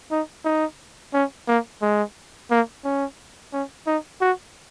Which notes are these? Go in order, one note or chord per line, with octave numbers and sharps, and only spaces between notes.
D#4
D#4
C#4
A#3
G#3
A#3
C#4
C#4
D#4
F#4